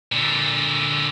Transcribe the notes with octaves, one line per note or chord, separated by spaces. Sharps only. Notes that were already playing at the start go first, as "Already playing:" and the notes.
A#2 D3